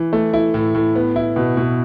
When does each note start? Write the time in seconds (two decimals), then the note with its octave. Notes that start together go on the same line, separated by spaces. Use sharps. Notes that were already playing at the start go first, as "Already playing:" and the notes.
Already playing: E3
0.13 A3
0.34 E4
0.54 A2
0.75 A2
0.95 B3
1.16 E4
1.36 B2
1.57 B2